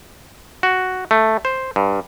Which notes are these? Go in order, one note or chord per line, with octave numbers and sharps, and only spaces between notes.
F#4
A3
C5
G2